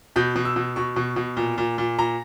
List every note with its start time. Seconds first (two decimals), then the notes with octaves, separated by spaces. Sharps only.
0.16 B2 G6
0.36 B2
0.45 E6
0.56 B2
0.76 B2 C#6
0.96 B2
1.16 B2
1.37 A#2
1.58 A#2
1.78 A#2
1.99 A#2 A#5